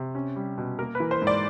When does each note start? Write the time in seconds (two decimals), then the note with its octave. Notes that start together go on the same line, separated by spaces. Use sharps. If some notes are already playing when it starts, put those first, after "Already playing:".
Already playing: C3
0.15 C#4
0.36 G3
0.58 B2
0.79 A#3 A#4
0.95 B4
1.00 E3
1.11 C5
1.22 G#2
1.27 D5